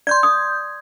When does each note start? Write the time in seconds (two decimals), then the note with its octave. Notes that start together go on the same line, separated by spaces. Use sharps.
0.07 D5 C6 G6 G#6
0.23 D#6